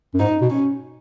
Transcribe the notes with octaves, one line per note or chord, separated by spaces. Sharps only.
F#2
G#2 D#4
B2
C#4